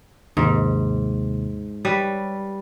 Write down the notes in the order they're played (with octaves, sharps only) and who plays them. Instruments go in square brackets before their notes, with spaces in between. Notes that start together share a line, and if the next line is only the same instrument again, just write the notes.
[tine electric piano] D#2 C3 [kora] G#2
[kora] G3 B4 [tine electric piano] C#5